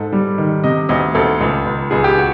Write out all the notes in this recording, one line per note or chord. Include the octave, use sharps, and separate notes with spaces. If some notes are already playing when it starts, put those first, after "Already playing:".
Already playing: G#2 A4
G3
D#3
C3 D#5
D2 D#5
D2 A4
C#2
C#2
C#2 G#4
G4
F#4